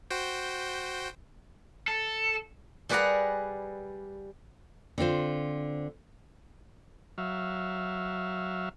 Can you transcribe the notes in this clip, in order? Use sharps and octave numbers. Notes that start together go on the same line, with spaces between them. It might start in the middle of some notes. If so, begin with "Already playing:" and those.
F#4 C5 G5
A4
G3 G#4 B4 D5 F#5 A#5
D3 C4 F4 C5
F#3 E5 F5